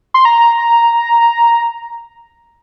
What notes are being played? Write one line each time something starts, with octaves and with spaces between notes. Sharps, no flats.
C6
A#5